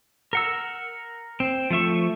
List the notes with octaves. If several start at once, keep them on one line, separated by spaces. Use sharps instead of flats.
A#4 F#5 E6
C4
F3 A3 E5 C#6